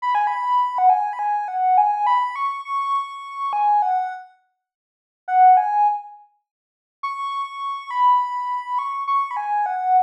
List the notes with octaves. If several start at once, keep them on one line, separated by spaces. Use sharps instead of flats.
B5
G#5
B5
F#5
G#5
B5
G#5
F#5
G#5
B5
C#6
C#6
G#5
F#5
F#5
G#5
C#6
B5
C#6
C#6
B5
G#5
F#5